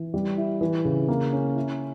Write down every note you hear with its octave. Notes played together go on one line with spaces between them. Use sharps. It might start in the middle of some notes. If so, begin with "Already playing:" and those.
Already playing: E3
G3
E4
E3
C#3
A#3
C#4
E4